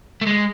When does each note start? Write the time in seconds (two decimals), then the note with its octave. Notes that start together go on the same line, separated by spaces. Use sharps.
0.21 A3
0.27 G#3